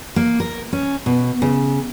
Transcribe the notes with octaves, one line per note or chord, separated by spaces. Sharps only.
A#3
A#4
C#4
B2
C#3